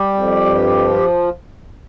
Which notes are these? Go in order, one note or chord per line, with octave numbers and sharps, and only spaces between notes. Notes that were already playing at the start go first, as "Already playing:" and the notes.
Already playing: G3 G4
F2
G2
F3